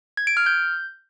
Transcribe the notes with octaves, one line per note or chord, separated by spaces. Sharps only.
G#6
D7
F6
G6